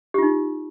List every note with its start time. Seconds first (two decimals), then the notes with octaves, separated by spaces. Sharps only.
0.14 G4
0.18 F4
0.22 D#4